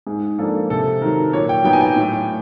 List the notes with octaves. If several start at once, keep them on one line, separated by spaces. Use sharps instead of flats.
G#2 G#4
F3 A#3 D4 A4
C3 A4
D#3 F#3 A#4
A#2 C#5
G5
F#3 B3 D#4 G5
G#5
G5
A2